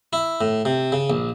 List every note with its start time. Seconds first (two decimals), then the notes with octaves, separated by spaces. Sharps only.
0.13 E4
0.41 A2
0.65 C3
0.92 C#3
1.10 A#1